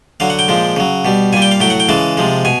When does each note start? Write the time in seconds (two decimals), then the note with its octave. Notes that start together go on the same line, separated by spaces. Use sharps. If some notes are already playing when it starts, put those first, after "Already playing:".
0.20 D3 F#3 F5
0.30 F#5
0.39 G5
0.48 A#2 F3 G#3
0.77 C#3 F#3
1.05 B2 G3
1.33 A#2 G3 G#5
1.42 G5
1.51 F5
1.60 A2 F#3 G5
1.70 F#5
1.80 G5
1.89 C#3 E3 G#3 A5
2.17 C3 F3 G#3
2.45 B2 G#5